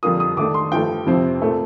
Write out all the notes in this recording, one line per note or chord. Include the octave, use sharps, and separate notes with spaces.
F2 D3 G3 A#3 F4 D#6
D#6
D#3 A3 D4 D6
C6
G2 F3 A3 G5
F2 C3 F3 C4
A#2 A3 C4